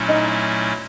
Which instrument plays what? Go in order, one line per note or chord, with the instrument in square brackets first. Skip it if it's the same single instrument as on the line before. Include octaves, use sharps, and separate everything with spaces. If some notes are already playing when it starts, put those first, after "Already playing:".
Already playing: [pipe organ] A#2 F#3 A3 C#4 E4
[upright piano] D#4